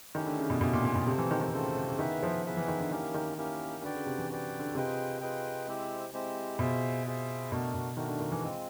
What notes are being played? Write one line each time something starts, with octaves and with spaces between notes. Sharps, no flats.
D#3 A3 C#4 E4 G4
D3
C#3
B2
B2 A3 C#4 E4 G4
A#2
A#2
B2
C3 A3 C4 F4 A4 C5
E3
D#3
D#3
C#3 A3 C4 F4 A4 C5
C3
C#3
D#3 B3 E4 G#4 B4 E5
F3
B3 E4 G#4 B4 E5
E3
D#3
D3
D#3 A#3 C#4 E4 G4 A#4
D#3
A#3 C#4 E4 G4 A#4
D3 F#4 B4 D5 G5
C#3
C3
E3
F#4 B4 D5 G5
D3
C3 F4 G#4 B4 D#5 G5
F4 G#4 B4 D#5 G5
G#3 C4 E4 G4 C5
G#3 C4 E4 G4 C5
B2 F4 G#4 C5 E5
F4 G#4 C5 E5
B2 A3 D4 F#4 A#4
B2
D#3 A3 D4 F#4 A#4
D3
D#3
E3
G#3 C4 F4